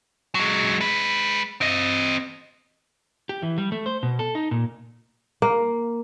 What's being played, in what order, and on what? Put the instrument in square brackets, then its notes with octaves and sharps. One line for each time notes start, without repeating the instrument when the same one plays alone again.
[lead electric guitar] F#3 G#3
G#3 B4
C4 D#5
G4
E3
G3
A3
C5
B2
A4
D#4
A#2
[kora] A#3